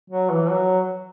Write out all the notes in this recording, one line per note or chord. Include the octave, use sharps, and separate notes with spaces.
F#3
E3
F#3